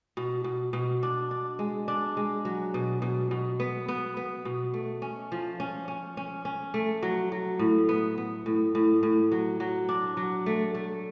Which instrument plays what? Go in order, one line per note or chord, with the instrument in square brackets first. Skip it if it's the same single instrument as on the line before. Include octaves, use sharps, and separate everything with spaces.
[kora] B2
B2
B2
D4
D4
G#3
D4
G#3
F#3
B2
B2
B2
B3
B3
B3
B2
A3
C#4
F3
C#4
C#4
C#4
C#4
A3
F#3
F#3
A2
B3
B3
A2
A2
A2
F#3
F#3
D4
F#3
A3
A3